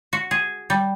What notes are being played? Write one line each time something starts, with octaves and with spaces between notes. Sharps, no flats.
F#4
G#4
G3